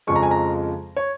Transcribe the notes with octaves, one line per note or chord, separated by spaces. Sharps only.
F2 C#3 F3 G#3 C#6
A#5
G#5
A#5
C#5